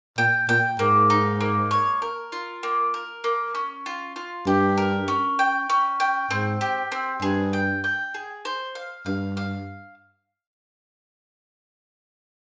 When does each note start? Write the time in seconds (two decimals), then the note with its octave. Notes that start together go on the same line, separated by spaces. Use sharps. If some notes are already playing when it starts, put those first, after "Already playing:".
0.18 A#2 G5
0.49 A#2 G5
0.79 G#2 A#3
1.10 D#4
1.41 A#3
1.71 C#5
2.02 A#4
2.32 F4
2.63 A#3
2.94 A#4
3.24 A#3
3.55 C#4
3.86 F4
4.16 F4
4.46 G2 G4
4.77 A#4
5.08 C#4
5.39 G5
5.70 C#4
6.00 G5
6.31 G#2 C4
6.61 G4
6.92 C4
7.22 G2 G#4
7.53 G5
7.84 G5
8.14 G#4
8.45 C5
8.75 F5
9.06 G2 F5
9.37 F5